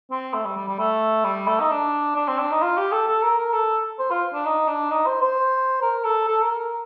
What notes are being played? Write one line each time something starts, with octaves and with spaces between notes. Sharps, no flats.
C4
A3
G3
G3
G3
A3
G3
A3
D#4
D4
D4
C4
D4
D#4
F4
G4
A4
A4
A#4
A#4
A4
C5
F4
D4
D#4
D4
D#4
C5
C5
A#4
A4
A4
A#4
A#4